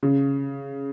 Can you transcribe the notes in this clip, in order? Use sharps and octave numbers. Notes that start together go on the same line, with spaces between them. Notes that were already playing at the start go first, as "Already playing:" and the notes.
C#3